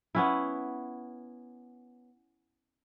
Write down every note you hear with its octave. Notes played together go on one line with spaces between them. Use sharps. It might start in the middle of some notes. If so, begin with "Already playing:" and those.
B3 C#4 E4